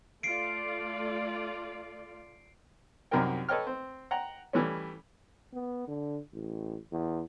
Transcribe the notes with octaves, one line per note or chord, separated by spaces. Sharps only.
A3 F4 D5 C7 D7
C2 F#2 D#4 G4 A#4 G5
A4 B4 C#5 D#5 G5 F6
C4
F#5 G5 A#5
E3 G3 A3 C#4
B3
D3
A1
E2